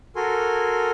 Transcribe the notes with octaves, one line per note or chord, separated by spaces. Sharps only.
F#4 A4 A#4 G#5 C6